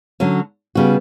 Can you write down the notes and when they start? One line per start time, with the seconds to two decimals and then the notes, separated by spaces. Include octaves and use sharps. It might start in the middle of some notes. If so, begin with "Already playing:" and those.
0.20 D3 F#3 C#4
0.75 C#3 G3 B3 F#4